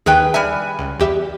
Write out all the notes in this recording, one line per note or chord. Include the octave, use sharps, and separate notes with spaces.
D#2 D#3 G#4 B4 G5
G3 E5 G#5 G#6
C#2
E2 G4 E5